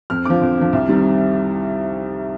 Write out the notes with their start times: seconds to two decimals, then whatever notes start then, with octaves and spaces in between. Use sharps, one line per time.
0.10 F2 F6
0.25 D3 F3 D6
0.42 F2
0.58 D3 F3
0.73 C2
0.88 C3 D#3 G3